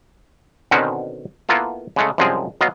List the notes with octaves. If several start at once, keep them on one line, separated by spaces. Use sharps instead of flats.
B2 D3 D#3 C4 C#4 F#4
A#3 B3 E4 F4 A4
C#3 G#3 A3
C2 F#2 F3 G#3 C4 G#4
F#3 B3 D#5 F5 A#5